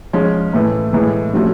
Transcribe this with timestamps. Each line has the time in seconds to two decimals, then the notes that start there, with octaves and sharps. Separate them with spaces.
0.13 F3 G#3 C#4
0.53 A2 E3 A3
0.93 A2 E3 G#3
1.33 C3 F3 A3 C#4 F#4